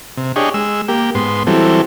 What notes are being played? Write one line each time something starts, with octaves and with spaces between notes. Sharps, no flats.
C3
D4 G4 G#4 C#5 D#5
G#3 E6
A#3 G4
G#2 B3 C6
E3 F#3 G3 C4 A4